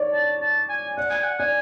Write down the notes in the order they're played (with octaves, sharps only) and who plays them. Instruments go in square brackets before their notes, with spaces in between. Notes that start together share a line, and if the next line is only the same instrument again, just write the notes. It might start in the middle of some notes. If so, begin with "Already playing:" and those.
Already playing: [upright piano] C#5 D5
[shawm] A5
A5
G#5
[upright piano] D5 [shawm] F#5
[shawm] G#5
F#5
[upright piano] D5 [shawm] G#5